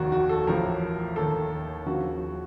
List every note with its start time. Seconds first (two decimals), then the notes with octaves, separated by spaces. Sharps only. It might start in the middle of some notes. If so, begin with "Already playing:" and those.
Already playing: F1 D#2 D#3 F#4
0.12 F#4
0.29 A4
0.47 A1 A2 F3 A#4
1.16 D#2 D#3 A4
1.86 D#2 C#3 F3 F#4